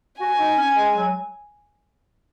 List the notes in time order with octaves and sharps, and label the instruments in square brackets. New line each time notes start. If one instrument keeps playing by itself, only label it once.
[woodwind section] F#4 [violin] G#5
[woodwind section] D#4
C#4
G#3
F#3